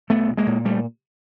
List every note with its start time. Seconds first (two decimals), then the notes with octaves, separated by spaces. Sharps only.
0.10 C2 A3 B3
0.28 A#2
0.37 G#3 A#3
0.47 A#2
0.65 G3 A3